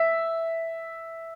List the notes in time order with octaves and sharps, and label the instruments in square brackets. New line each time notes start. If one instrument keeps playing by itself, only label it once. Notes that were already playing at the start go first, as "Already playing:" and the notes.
Already playing: [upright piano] E5